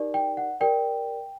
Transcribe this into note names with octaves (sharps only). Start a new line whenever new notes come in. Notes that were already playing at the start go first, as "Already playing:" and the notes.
Already playing: D#4 G4 A#4 D5
G5
F#5
G4 A#4 D5 G5